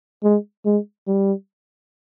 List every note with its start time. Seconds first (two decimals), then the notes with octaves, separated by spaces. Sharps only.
0.23 G#3
0.65 G#3
1.07 G3